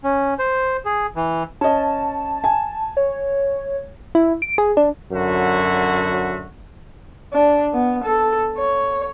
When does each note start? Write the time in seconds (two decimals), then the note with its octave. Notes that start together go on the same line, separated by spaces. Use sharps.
0.04 C#4
0.39 C5
0.85 G#4
1.16 E3
1.61 C#4 D#5 A5
2.44 G#5 A5
2.97 C#5
4.15 E4
4.42 D7
4.58 G#4
4.77 D4
5.12 F#2 D3 F#3 F#4 E5
7.33 D4
7.73 B3
8.04 A4
8.58 C#5